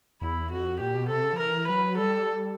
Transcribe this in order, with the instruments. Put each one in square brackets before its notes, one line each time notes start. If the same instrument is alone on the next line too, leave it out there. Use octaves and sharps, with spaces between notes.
[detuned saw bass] E2 [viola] E4
[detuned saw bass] F2 [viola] F#4
[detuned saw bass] A#2 [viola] G4
[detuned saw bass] B2
[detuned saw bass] C3 [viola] A4
[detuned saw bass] C#3
F3
[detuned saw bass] E3 [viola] A#4
[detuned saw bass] F#3 [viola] B4
[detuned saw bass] G3 [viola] A4